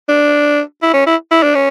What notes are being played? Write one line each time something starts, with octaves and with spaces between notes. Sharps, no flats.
D4
E4
C#4
E4
E4
D4
C#4